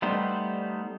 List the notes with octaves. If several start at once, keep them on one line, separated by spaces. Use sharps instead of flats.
G3 A3 B3 D#4 C5